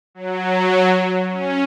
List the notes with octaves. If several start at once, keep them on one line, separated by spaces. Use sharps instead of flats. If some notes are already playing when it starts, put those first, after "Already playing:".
F#3
C#4